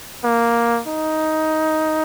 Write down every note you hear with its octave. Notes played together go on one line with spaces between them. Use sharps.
A#3
D#4